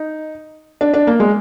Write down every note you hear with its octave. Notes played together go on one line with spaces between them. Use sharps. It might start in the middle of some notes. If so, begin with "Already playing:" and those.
Already playing: D#4
D4
D4
A#3
G#3